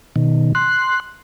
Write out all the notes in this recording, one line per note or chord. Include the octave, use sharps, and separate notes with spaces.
B2 D#3
C6 F#6